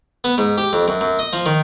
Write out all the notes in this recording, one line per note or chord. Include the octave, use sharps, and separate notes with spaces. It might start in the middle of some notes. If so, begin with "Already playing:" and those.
B3
G#2
G4
F2
F#2
F#2
D#5
F3
D#3